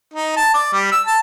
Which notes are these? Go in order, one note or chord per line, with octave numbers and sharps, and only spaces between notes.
D#4
A5
D5
G3
E6
A5